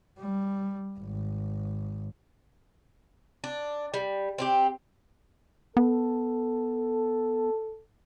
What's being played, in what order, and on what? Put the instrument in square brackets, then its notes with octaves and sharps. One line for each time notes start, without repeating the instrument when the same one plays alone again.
[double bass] G3
G#1
[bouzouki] D4
G3
C4 E4 G4
[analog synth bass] B3 [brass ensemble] A4